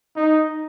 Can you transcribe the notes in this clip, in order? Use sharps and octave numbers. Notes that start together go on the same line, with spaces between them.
D#4